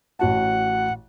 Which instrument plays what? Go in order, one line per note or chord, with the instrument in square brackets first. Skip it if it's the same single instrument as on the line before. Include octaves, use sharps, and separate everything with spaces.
[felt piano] A1 F#4 A5 [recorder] F#5